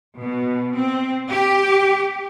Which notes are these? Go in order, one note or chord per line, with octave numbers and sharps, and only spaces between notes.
B2
C4
G4